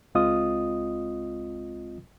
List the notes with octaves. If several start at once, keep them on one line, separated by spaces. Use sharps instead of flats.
C#2 G#3 C4 F4 D#5 D#6